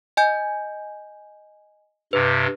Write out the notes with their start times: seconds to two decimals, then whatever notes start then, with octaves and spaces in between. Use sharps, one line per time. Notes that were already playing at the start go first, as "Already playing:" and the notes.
0.17 D#5 G#5 G6
2.13 G2 C3 B4